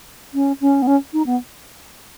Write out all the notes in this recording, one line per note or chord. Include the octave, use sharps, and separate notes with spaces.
C#4
C#4
B3
C#4
D#4
B3